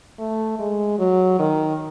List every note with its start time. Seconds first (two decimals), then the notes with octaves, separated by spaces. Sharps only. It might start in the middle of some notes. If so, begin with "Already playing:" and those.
0.19 A3
0.59 G#3
0.99 F#3
1.39 D#3